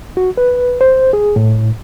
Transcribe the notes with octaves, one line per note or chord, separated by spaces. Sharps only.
F#4
B4
C5
G#4
A2